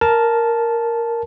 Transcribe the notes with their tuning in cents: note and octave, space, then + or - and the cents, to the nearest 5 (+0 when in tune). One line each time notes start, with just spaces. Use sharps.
A#4 +0 A5 -10